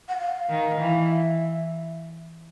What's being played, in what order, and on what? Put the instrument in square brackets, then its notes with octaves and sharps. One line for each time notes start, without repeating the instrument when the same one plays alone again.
[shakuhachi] F#5
F5
[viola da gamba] D#3
E3
[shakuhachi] E5